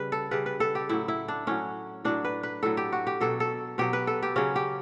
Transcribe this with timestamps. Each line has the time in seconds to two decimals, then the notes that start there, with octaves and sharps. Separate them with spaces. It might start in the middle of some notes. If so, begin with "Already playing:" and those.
Already playing: C#3 G3 B4
0.12 A4
0.31 C#3 G3 B4
0.46 B4
0.60 A4
0.75 G4
0.89 A2 F#3 E4
1.08 E4
1.28 D4
1.47 A2 F#3 C#4
2.05 A2 F#3 D4
2.25 B4
2.43 B4
2.63 A2 F#3 A4
2.77 G4
2.92 F#4
3.07 G4
3.21 B2 F#3 A4
3.40 A4
3.78 B2 F#3 G4
3.93 B4
4.07 A4
4.23 G4
4.36 C#3 F#3 C#4
4.56 G4